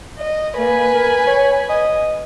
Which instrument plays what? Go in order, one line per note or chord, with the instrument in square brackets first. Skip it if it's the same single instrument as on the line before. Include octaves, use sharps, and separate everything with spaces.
[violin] D#5
[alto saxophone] A#3 [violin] B4 G#5
[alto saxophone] A#4
C#5
D#5